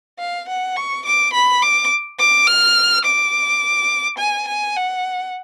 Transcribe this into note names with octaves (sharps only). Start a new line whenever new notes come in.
F5
F#5
C#6
D6
B5
D6
D6
F6
D6
G#5
G#5
F#5